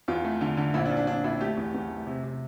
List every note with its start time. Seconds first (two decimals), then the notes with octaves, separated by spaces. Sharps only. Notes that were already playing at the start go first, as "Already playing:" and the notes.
0.08 E2 F4
0.24 A3
0.41 D3
0.57 D3
0.74 A#1 E4
0.86 D4
0.91 A#1
0.97 D4
1.07 A#1 D4
1.24 A#1 E4
1.41 A3 G4
1.57 E2
1.74 E2
1.90 A3
2.07 C3
2.23 C3